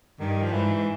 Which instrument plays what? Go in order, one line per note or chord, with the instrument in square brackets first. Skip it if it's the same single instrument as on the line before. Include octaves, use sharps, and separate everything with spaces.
[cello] G2 [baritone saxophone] D#3
[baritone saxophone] F3
[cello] G#2 [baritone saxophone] E3